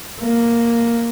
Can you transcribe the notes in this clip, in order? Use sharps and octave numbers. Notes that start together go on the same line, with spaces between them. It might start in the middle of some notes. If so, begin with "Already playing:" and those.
A#3